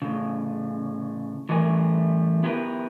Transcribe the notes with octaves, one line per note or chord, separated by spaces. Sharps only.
A2 C#3
A2 E3 G3 A3 A#4 G#5
B3 E4 G4 A#4 B4